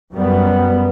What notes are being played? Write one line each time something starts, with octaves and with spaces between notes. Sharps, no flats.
F#2 G3 B3